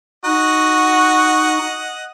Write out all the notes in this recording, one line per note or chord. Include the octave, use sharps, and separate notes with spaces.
D#4 F#4 D#5 F#5